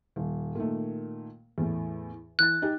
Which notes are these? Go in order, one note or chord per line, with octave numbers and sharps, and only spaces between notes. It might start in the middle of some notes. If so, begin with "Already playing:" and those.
D#1
A#2 D#3 A3
E2 A2
E3 F#6 A6
D#4 G4